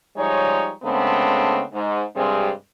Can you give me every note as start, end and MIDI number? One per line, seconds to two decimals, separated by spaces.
0.17 0.70 53
0.17 0.70 55
0.17 0.70 56
0.17 0.70 63
0.17 0.70 73
0.83 1.61 49
0.83 1.61 56
0.83 1.61 57
0.83 1.61 59
0.83 1.61 60
0.83 1.61 62
1.73 2.02 44
2.16 2.49 43
2.16 2.49 48
2.16 2.49 55
2.16 2.49 56
2.16 2.49 60
2.16 2.49 68